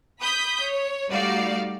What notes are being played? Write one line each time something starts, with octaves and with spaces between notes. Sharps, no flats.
B5 D#6 G6 B6
C#5
G3 A3 D#4 F#4 D5 F5